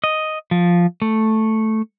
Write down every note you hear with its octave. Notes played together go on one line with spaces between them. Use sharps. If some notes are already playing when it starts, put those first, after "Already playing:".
D#5
F3
A3